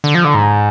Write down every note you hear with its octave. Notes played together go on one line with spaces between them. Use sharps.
D3
F3
D3
G#2